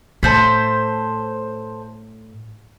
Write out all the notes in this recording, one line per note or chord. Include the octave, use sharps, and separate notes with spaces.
A2 A4 C5 B5